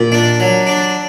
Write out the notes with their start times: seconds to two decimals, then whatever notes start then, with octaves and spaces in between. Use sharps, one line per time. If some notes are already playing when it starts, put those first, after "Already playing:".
Already playing: A#2
0.12 D4
0.40 F#3
0.67 D4